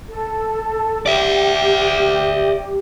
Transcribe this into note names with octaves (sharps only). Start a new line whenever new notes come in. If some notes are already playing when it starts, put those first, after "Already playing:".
A4
G4 D5 E5